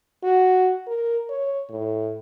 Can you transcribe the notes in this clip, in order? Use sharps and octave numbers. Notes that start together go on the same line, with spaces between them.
F#4
A#4
C#5
A2